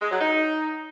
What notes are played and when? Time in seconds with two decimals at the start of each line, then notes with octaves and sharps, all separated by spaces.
0.02 G#3
0.11 F#3
0.21 D#4